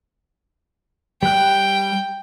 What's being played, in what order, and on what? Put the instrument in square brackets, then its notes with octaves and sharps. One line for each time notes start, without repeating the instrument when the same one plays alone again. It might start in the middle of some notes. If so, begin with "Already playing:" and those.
[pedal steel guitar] G3 F#6 [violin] G5